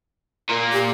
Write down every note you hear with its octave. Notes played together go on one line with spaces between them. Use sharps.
A#2 A#3
G4